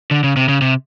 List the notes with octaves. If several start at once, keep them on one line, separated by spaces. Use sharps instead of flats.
D3
C#3
C3
C#3
C3